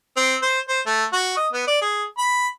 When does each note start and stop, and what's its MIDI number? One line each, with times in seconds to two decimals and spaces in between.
0.17 0.36 60
0.42 0.60 72
0.69 0.80 72
0.86 1.05 57
1.13 1.33 66
1.37 1.48 75
1.53 1.65 59
1.67 1.80 74
1.81 2.04 68
2.18 2.47 83